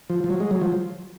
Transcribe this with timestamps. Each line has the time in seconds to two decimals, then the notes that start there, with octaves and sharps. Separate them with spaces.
0.10 F3
0.24 F3
0.30 F#3
0.40 G#3
0.51 F#3
0.61 F3